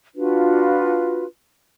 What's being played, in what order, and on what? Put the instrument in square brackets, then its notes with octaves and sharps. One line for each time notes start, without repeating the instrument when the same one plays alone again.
[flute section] D4 F4 F#4 B4